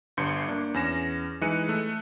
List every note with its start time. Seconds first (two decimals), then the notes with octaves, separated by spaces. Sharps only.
0.17 G1 G2 C6 G6 C#7
0.48 A#3 D4
0.74 E2 C#4 A#6 E7
1.41 E3 G#3 D#4 F#6 C#7 D#7
1.69 A3